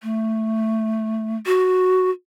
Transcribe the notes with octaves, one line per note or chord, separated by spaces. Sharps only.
A3
F#4